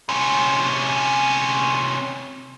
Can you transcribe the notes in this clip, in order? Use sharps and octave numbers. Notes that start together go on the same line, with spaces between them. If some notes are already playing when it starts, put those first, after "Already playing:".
C3 C#4